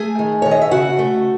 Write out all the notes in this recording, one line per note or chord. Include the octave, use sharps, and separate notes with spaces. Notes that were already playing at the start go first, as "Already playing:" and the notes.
Already playing: A3 G#4 G#5
D#3
D#3 C#5
D#5
E5
C#3 F#4 F#5
A3